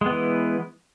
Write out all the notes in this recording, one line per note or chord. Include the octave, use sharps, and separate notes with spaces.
E3 G#3 B3